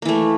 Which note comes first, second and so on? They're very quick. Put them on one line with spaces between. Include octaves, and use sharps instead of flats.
A#3 E3 A3